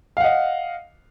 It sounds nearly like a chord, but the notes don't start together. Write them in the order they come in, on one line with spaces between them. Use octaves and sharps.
F5 F#5 D#5